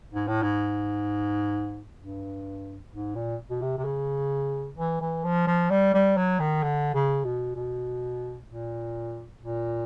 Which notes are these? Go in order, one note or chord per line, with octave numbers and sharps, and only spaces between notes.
G#2
A2
G#2
G2
G#2
A#2
B2
C3
C3
C#3
E3
E3
F3
F3
G3
G3
F#3
D#3
D3
C#3
B2
B2
A#2
A#2